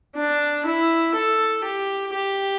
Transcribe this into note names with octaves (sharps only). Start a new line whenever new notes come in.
D4
E4
A4
G4
G4